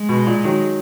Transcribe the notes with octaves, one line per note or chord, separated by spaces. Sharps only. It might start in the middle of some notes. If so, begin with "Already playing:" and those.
Already playing: G#3
B2
A#2
D#3 F#3